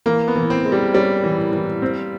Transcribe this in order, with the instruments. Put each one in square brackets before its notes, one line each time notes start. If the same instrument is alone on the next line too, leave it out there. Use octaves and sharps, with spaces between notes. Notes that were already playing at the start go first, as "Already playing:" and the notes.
[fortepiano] E3 [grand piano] A#3
[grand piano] B3
[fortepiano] E3
[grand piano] C4
[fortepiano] G#3
[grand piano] G3
[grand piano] G3 [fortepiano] C#4
[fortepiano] E3
E3
C4